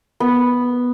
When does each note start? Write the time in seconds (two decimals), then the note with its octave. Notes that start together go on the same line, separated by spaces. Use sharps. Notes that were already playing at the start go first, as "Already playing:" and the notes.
0.20 B3